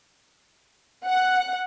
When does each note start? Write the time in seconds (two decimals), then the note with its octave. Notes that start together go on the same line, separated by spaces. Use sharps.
1.06 F#5